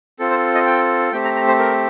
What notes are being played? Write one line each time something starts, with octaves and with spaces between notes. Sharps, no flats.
C4 F4 A4
C5
D#5
G5
A3 C4 G4 G5
A#5
A#5
C5
A#4